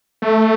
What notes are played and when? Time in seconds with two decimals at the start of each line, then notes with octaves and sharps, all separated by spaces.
0.22 A3